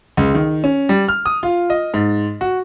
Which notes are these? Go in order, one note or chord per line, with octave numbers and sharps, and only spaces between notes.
C#2
D#3
C#4
G3
F6
D#6
F4
D#5
G#2
F#4